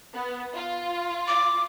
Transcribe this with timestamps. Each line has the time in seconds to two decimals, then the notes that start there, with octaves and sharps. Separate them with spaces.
0.15 B3
0.54 F4
1.28 D6